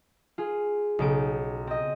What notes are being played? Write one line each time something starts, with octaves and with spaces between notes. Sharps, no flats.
F4 G#4
B1 C#3 D7
C4 D#5